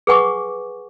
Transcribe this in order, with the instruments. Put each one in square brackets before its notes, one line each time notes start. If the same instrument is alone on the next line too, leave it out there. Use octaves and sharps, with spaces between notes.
[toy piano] G#4 B4 F#5 G#5 C#6 D6